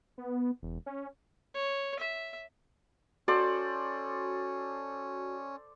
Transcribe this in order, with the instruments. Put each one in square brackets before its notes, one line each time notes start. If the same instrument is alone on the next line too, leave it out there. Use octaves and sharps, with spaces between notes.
[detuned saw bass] B3
E1
C#4
[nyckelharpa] C#5
E5
[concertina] C#4 [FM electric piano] F#4 [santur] A4 C5 D5